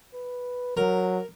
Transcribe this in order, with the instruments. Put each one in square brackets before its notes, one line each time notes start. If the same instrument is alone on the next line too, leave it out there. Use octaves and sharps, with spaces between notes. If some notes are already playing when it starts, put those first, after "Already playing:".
[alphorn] B4
[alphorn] F#3 [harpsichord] A#4